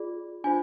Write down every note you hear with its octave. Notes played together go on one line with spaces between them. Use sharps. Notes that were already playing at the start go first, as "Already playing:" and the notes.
Already playing: F4 G#4 D5
D4 F4 C5 G#5